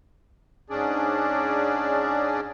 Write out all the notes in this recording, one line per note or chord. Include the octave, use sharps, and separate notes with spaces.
G#2 C#4 D4 G#4 D5